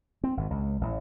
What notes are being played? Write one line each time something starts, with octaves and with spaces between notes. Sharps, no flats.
C4
G#1
C#2
A1